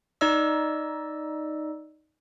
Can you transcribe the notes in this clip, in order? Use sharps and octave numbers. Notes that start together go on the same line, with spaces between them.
D#4 D5 D#5 E6